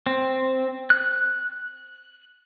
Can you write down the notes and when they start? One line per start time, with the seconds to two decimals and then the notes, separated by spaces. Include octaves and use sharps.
0.06 C4
0.90 F#6